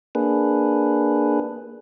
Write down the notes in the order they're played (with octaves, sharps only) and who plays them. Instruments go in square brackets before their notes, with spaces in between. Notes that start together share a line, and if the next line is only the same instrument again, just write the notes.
[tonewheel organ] A#3 D4 G#4 B4